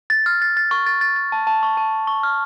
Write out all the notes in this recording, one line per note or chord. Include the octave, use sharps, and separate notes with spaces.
A6
F6
A6
A6
C#6
A6
A6
A6
A5
A5
C#6
A5
C#6
C#6
F6